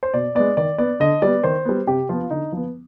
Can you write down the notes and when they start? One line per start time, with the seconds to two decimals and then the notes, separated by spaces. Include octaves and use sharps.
0.03 C5
0.14 B2 D5
0.35 G#3 B3 D5
0.57 D#3 D5
0.78 B3 D5
1.00 D3 D#5
1.22 G3 B3 D5
1.44 D#3 C5
1.65 G3 B3
1.87 C3 G4
2.09 F3 B3 F4
2.30 D3 D#4
2.52 F3 B3